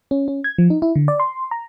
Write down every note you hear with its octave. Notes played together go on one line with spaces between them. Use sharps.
C#4
C#4
G#6
F3
D#4
E4
D3
D5
C6
A#5